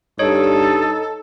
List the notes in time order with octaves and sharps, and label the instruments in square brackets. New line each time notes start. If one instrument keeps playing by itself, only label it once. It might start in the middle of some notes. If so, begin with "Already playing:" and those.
[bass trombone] G2 [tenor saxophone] D#4 [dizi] A4 [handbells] C#5